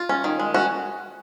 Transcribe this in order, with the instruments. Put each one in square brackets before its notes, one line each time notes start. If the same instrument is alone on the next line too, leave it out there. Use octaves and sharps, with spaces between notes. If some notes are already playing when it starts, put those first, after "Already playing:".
Already playing: [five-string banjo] F4
C#4
D#3
G#3
C#4 F#4